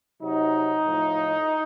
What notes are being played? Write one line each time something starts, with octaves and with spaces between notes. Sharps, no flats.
C3 F#3 D#4
A2 F3